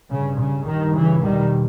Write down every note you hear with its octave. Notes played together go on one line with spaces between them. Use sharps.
G2 C#3
C#3
G2 D#3
C#3 E3
E2 B2 D#3 G3